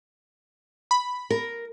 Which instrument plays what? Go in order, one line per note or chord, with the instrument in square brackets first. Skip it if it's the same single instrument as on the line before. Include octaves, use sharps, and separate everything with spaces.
[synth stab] B5
[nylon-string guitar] A#4